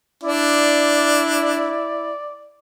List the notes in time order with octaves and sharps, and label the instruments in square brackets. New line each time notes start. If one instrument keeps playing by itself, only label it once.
[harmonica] D4 [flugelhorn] E4 [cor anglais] D5